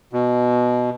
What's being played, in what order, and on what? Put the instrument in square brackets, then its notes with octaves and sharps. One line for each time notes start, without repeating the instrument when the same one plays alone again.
[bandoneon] B2